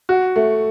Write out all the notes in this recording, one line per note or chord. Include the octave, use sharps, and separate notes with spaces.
F#4
A3